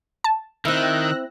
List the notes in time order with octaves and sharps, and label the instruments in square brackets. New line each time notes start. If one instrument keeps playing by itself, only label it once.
[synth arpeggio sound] A5
[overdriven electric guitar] D#3 [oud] C4 E4 [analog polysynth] E6 F#6 A#6